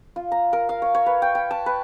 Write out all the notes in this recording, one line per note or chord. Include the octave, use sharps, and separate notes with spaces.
F4
A#5
A#4
F5
C#5
C#5
B4
G5
G5
A5
B4